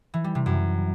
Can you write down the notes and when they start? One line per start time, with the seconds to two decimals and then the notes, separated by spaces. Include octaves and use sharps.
0.14 E3
0.24 G3
0.35 C3
0.46 F#2